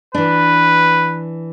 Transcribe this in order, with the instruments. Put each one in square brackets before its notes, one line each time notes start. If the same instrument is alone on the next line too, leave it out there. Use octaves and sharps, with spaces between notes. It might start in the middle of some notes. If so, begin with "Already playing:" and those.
[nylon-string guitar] E3 D4 [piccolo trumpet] B4